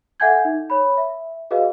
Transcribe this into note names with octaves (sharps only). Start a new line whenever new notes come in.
A4 E5 F#5 G#5 G6 G#6
D#4
C#5 B5
E5
F#4 G#4 B4 D#5 F5